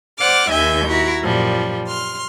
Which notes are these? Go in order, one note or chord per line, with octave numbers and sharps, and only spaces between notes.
C5 D5 F#5 D6 F6
D#2 D#3 E5 G#5 G6
E4 F#4 A#5
F#2 A#2 F3 G3
C6 F6